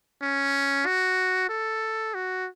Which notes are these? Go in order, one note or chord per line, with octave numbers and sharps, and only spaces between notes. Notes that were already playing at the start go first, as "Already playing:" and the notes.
C#4
F#4
A4
F#4